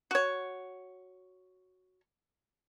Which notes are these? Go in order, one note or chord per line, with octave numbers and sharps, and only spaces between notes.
F#4 C#5